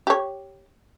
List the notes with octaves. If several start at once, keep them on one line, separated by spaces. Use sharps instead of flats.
G4 C#5